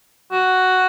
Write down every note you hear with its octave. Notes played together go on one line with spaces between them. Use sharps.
F#4